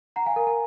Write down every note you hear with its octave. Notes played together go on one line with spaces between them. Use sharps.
F#5 A#5
F5 G#5
A#4
A#4